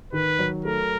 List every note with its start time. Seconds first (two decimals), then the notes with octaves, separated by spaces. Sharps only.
0.13 D#3 B4
0.39 F#3
0.65 A3 A#4